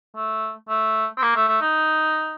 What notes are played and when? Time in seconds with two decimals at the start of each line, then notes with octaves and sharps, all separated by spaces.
0.15 A3
0.69 A3
1.17 C4
1.22 A#3
1.35 A3
1.48 A3
1.61 D#4